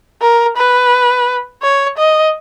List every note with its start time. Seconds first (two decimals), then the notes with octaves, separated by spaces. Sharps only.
0.22 A#4
0.57 B4
1.62 C#5
1.98 D#5